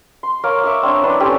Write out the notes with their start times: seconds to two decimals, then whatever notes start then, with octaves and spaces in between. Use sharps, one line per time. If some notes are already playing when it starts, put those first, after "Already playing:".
0.23 C6
0.43 A#4 C#5 F5 D6
0.64 E5 C#6 D6
0.83 C4 D4 C#5 F#5
1.03 D4 E4 B4
1.20 C4 C#4 G4 A4